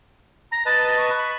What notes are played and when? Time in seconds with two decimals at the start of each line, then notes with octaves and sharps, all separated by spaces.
0.52 A#5 A#6
0.66 B4 D#5 A5 A6
0.97 C#6
1.19 B5